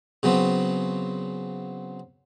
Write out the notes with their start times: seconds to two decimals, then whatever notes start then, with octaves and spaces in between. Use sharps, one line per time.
0.23 C#3 F#3 B3 C4